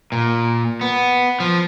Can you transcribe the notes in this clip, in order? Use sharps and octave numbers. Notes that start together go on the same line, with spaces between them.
A#2
B3
F3